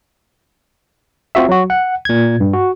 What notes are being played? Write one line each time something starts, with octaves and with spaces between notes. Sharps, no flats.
C4 F4 F#4 E5
F#3 F#4
F#5
A#2 G#6
G2
F#4